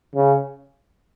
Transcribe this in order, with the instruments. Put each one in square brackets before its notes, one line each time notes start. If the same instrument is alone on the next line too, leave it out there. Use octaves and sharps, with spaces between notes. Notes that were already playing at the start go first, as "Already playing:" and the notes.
[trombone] C#3